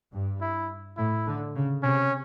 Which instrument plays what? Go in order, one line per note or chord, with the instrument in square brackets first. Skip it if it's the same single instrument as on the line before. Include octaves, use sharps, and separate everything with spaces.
[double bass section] G2
[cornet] E4
[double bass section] A2 [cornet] E4
[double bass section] D3
C#3
[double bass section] C3 [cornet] C#4